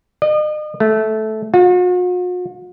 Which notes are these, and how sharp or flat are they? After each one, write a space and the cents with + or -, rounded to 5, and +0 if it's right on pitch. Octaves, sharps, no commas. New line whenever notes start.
D#5 -40
A3 -15
F#4 -45